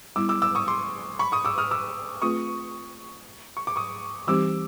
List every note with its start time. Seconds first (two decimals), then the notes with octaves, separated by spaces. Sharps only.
0.16 G3 B3 E4 D6 E6
0.29 D6 E6
0.42 D6 E6
0.55 C#6 D#6
0.68 C6 D6
1.19 B5 C#6
1.32 C#6 D#6
1.45 D6 E6
1.58 D#6 F6
1.71 D6 E6
2.22 A3 C4 F4 G#4 B4 C#6 D#6
3.57 C#6
3.67 D6
3.76 C#6 D#6
4.27 E3 G3 C4 D#4 G4 D6 E6